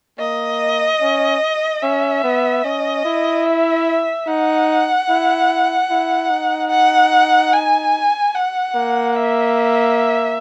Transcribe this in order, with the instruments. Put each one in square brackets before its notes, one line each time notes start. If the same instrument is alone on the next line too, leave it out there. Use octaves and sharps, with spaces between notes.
[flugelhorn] A#3 [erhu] D#5
[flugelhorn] C#4
[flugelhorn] C#4 [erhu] E5
[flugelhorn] B3
[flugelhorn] C#4 [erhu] D#5
[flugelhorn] E4
[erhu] E5
[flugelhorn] D#4 [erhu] F#5
[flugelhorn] E4
E4
D#4
[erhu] F#5
G#5
F#5
[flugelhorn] A#3
[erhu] E5